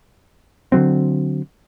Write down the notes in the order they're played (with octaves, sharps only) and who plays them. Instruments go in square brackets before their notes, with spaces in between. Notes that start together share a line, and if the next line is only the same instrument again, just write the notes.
[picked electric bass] D3 F3 F#3 C4